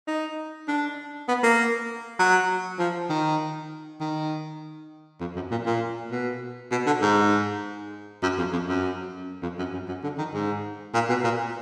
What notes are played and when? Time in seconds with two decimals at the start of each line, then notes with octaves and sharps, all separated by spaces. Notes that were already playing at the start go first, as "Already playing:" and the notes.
0.08 D#4
0.68 D4
1.28 B3
1.43 A#3
2.19 F#3
2.79 F3
3.10 D#3
4.01 D#3
5.21 F2
5.36 F#2
5.51 A#2
5.66 A#2
6.11 B2
6.71 B2
6.86 D3
7.02 G#2
8.23 F#2
8.38 F2
8.53 F2
8.68 F#2
9.43 F2
9.58 F#2
9.74 F#2
9.89 F#2
10.04 D3
10.18 D#3
10.34 G#2
10.94 A#2
11.09 B2
11.24 A#2